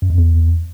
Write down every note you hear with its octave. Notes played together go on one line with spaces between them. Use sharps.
F#2
F2
E2